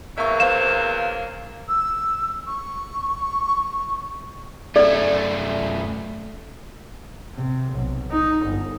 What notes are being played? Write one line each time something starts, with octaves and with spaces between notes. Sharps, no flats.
E2 F#3 A#3 E5 C#6
C5 F5 E7
E6
C#6
F#2 A3 A4 D5
C3
B1
D#4
G1